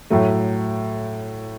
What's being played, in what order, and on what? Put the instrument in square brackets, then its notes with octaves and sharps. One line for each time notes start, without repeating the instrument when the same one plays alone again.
[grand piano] A2 F#3 A3